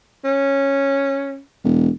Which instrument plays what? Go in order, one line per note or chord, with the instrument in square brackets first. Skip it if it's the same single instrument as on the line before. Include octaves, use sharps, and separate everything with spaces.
[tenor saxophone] C#4
[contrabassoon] E1